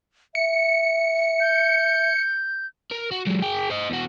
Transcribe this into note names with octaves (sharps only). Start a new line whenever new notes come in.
E5 C#7
G6
A#4
F#4
F#3 G#3
G#4 G5
C5 D#5
E2 F#4